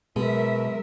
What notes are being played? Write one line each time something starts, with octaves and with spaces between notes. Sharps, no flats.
B2 F#3 G#3 A#4 E5